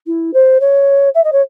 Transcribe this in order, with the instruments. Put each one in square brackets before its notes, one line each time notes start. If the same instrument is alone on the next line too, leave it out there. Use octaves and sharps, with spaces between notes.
[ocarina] E4
C5
C#5
E5
D#5
C#5